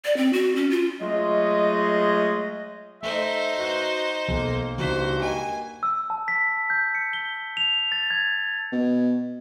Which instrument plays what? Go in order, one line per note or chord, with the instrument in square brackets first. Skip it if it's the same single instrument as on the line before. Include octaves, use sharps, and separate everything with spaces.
[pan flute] D5
C4
F#4
C#4
F4
[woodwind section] F#3 G#3 A3 F4 G#4 D#5
[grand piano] A3 [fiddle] D#4 C5 [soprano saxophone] E5
[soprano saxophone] F#4 [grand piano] B4 F#6 G6
[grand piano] B1 [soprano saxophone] A#3
[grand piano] C#2 A#5 B6 [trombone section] G2 D#4 F#4 [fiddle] C5
[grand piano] D#5 G5 [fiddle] G#5
[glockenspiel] E6
A5
B6
G6
C#7
G7
F7
A6
G#6
[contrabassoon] B2